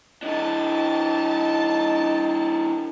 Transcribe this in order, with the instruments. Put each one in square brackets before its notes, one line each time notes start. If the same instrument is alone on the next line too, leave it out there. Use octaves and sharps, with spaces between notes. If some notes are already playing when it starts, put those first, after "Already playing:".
[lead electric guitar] E3 D4 [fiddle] D#4 A5